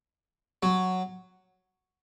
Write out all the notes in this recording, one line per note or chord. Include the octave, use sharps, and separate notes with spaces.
F#3